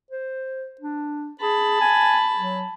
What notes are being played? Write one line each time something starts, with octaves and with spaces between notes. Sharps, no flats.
C5
D4
G#4 A5 B5
G#5
F#3